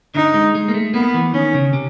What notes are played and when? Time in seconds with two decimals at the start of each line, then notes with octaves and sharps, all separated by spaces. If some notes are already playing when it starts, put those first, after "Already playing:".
0.15 D3 D#4
0.34 G#3
0.55 G#3
0.68 A#3
0.74 A3
0.94 A#3 B3
1.14 E3
1.34 D#3 C#4
1.54 C#3
1.73 C3